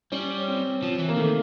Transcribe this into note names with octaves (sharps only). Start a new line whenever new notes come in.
G3 C#4
C4
F3
E3
A#3
D#3 A3